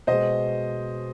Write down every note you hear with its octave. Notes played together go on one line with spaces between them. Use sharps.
B2 G#3 C5 D#5